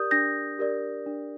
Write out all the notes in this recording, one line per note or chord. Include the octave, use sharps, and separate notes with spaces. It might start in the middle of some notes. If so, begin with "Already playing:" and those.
Already playing: G4 A#4 D5 D#6 G6
D4 G6 A#6
G4 A#4 D5
D4